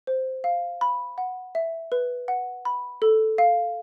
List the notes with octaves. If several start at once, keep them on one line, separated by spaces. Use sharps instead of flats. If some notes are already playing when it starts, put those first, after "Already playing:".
C5
F5
B5
F#5
E5
B4
F#5
B5
A4
F5